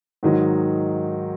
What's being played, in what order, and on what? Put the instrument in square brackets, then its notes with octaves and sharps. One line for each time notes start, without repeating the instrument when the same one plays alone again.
[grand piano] G#2 D#3 F#3